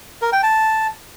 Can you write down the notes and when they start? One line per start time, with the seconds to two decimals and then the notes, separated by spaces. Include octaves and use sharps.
0.22 A#4
0.32 G5
0.43 A5